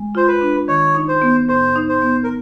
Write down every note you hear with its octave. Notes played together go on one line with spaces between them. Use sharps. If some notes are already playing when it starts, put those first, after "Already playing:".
Already playing: G#3
F4 C5
B4
D4
D#3 C#5
D#4
C5
B3
A2 C5
D#4
C5
B3
A#4